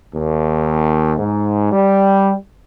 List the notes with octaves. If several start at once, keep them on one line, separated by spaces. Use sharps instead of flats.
D#2
G#2
G3